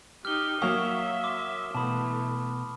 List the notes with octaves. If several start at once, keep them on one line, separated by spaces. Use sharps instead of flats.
D#4 G4 F6 G7
F#3 A#3 E5 F5 C#6 D#6
C6 D6
B2 E3 A3 A5 B5 D#6